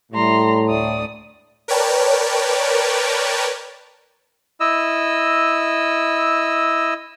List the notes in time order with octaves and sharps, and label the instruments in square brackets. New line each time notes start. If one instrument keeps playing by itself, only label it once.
[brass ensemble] A2 [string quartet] G3 A#5 C6
[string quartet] D2 D5 D#6
[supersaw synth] A#4 B4 C#5 D5 G5 A5
[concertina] E4 D#5 E6